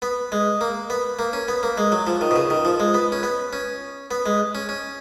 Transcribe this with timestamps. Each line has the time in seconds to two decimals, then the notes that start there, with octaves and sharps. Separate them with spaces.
0.02 B3
0.32 G#3
0.61 A#3
0.90 B3
1.19 A#3
1.33 C#4
1.48 B3
1.63 A#3
1.78 G#3
1.92 F#3
2.07 F3
2.21 D#3
2.31 B2
2.36 C#3
2.50 D#3
2.65 F3
2.80 G#3
2.94 B3
3.12 C#4
3.23 B3
3.53 C#4
4.11 B3
4.26 G#3
4.55 C#4
4.69 C#4